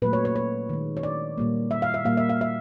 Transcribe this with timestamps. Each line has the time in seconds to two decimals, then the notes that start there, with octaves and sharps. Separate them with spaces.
0.02 A#2 F#3 A3 B4
0.13 C#5
0.25 C#5
0.36 C#5
0.69 D#3 G#3
0.97 C#5
1.03 D5
1.38 A#2 G3 A#3
1.71 E5
1.82 F5
1.94 E5
2.05 A#2 G3 A#3 F5
2.17 E5
2.29 F5
2.41 E5